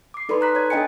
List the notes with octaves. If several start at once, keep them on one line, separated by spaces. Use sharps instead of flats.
D6 C7
D#4 A4 B4 D5 B5 C6
A#5 F#6 B6
C#5 G#6
D4 A4 D#5 G5 G#5 C#7